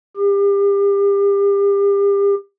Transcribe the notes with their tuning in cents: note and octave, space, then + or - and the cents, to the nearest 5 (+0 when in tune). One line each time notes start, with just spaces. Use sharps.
G4 +35